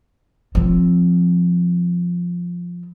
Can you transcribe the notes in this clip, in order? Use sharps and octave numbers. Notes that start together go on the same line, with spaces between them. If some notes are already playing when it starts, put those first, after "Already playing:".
F3 C4